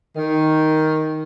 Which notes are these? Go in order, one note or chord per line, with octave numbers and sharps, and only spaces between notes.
D#3